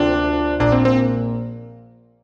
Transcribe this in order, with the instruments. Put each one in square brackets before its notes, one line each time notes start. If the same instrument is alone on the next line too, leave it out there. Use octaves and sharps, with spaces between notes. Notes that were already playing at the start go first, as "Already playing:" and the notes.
Already playing: [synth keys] D2 C3 A#3 F4 [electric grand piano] D4
[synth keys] A#1 A#2 A#3 [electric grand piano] D4
[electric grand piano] C4
C4